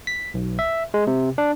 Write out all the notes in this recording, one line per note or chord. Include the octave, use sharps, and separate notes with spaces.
B6
B1
E5
G#3
C3
D4